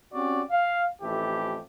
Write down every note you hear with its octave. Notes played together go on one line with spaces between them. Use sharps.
C4 C#4 F#4 G4 D5
F5
A1 F2 E3 A3 G4